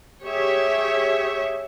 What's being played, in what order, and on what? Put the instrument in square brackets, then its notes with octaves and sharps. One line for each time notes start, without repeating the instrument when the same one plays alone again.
[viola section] G4 G#4 C#5 E5